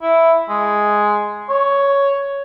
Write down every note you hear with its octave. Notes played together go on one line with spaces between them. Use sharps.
E4
G#3
C#5